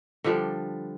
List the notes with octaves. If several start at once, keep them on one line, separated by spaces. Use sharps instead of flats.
D3 F3 G3 D4